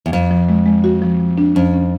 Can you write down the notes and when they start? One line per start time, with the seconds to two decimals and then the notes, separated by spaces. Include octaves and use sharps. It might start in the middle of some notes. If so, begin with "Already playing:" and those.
0.06 E2
0.13 F2 F3
0.31 F3
0.49 G#3
0.66 G#3
0.84 F#4
1.02 F3
1.20 F3
1.38 D4
1.55 F2 C#4
1.73 C#4